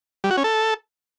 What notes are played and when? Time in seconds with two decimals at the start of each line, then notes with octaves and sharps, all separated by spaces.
0.24 G3
0.31 F#4
0.37 C#4
0.44 A4